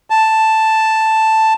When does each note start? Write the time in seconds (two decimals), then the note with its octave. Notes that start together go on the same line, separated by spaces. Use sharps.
0.10 A5